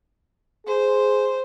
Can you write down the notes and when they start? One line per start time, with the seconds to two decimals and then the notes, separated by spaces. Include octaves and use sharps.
0.67 G#4 C5